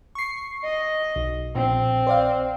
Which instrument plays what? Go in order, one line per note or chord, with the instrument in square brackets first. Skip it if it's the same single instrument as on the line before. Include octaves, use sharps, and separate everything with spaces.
[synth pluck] C#6 C7
[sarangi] D#5
[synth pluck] B1
[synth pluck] A#1 [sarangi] C4
[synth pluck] C5 D5 F5